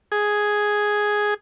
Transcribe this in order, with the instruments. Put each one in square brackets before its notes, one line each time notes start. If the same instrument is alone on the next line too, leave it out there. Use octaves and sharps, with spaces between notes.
[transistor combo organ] G#4